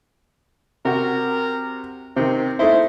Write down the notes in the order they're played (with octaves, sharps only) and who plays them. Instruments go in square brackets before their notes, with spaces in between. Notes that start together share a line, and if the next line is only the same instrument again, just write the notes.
[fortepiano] C3 F#4 [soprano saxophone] A#4
[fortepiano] C3 D#3 [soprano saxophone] C4
[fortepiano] A3 D#4 E4 [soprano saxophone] C5